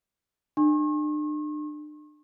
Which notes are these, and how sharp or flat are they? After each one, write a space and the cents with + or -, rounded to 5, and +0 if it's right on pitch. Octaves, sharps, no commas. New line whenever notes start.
D4 +40 C#6 -45